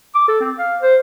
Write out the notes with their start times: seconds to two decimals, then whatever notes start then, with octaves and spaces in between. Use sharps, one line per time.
0.15 D6
0.28 A4
0.41 C4
0.58 F5
0.82 C5